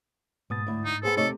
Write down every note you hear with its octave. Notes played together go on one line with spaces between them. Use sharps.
G#2 B2 D#6 A6
D2 E4
D#4
B3 G#4 A4 C5
C3 A3 D#4 A4 C#5 D#5